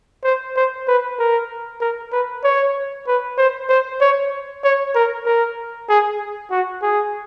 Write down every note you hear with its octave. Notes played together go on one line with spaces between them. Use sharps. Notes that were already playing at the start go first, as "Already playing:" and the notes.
C5
C5
B4
A#4
A#4
B4
C#5
B4
C5
C5
C#5
C#5
A#4
A#4
G#4
F#4
G#4